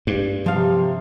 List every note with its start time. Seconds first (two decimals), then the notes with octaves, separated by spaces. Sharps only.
0.07 G2
0.46 C3 F3 F5